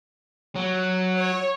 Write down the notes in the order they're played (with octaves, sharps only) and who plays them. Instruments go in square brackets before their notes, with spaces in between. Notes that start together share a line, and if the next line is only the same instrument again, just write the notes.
[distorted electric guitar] F#3
[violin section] C#5